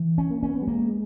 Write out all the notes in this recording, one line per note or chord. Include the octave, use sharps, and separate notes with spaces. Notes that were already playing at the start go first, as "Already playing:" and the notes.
Already playing: E3
C#4
A#3
C#4
B3
G3
G#3 A#3